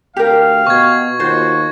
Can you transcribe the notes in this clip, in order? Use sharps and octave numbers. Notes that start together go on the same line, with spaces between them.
D2 G4 A#4 F5
B2 C#6 G#6
D#2 F4 F#4 C5